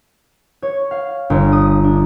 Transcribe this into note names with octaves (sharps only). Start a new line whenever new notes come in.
C#5
F5
G1
D#6
D4